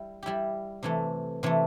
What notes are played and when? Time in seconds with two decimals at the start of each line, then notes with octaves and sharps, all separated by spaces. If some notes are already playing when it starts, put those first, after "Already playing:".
Already playing: G3 E4
0.23 G3 E4 G4
0.83 C3 E3 A3
1.43 C3 E3 A3